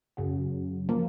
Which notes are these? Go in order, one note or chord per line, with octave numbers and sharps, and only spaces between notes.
F#2 C#3 F#3
F3 A#3